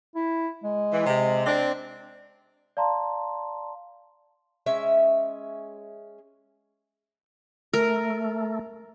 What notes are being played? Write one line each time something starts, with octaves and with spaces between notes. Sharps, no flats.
E4
G#3
E3
C3
C4 D4
D5 F5 A5 A#5 C6
G#3 C#4 E5
A3 A#4